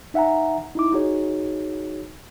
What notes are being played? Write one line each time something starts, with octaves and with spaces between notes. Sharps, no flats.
D#4 E5 F#5 G#5 A#5
D#4 E4 D6
D#4 F#4 G#4 C#5